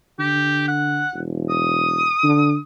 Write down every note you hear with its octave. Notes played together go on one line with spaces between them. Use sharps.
D3 G4
F#5
E1
D#6
D3